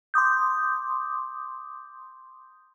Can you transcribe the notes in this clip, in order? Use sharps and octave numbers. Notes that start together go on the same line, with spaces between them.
C6 D6 D#6 G6